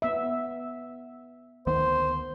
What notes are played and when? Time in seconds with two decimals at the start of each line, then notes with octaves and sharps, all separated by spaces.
0.02 B3 E5
1.67 D2 D#3 B3 C5